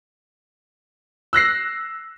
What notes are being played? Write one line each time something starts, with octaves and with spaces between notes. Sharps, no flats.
E6 F#6 A#6 C7